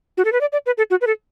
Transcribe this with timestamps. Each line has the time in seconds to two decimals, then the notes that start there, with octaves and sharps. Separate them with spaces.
0.17 F#4
0.25 A4
0.32 B4
0.41 D5
0.52 D5
0.66 B4
0.78 A4
0.91 F#4
1.01 B4
1.07 A4